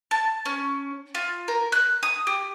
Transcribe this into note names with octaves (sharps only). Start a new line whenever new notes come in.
A5
C#4
F4
A#4
F#6
D#6
G4